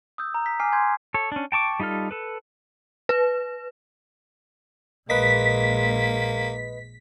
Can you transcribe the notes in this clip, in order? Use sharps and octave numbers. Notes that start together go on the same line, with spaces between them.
D#6 E6 G6
A#5
B6
G#5 D6 F6 C7
G#5 C6 G6 G#6
A4 C#5
C#4 D4
G5 A5 C#6 D6
G3 D#4 F4 A4 F6
A4 B4
B4
A#1 G#3 A#3 B4 D#5 B6